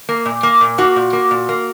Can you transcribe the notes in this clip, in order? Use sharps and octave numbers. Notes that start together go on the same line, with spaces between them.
A#3
A#2
A#3
A#2
A#3 F#4
A#2
A#3
A#2
A#3